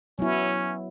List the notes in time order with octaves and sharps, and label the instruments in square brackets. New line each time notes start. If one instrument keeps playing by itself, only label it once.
[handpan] F#3 B3 E4 [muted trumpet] C#4